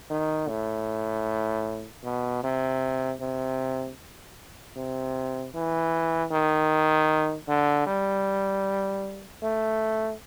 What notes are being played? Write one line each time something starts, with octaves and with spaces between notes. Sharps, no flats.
D#3
A2
B2
C3
C3
C3
E3
D#3
D3
G3
A3